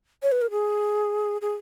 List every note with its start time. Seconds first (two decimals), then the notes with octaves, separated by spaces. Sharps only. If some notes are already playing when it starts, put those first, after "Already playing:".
0.23 C#5
0.32 B4
0.42 A#4
0.51 G#4
1.41 G#4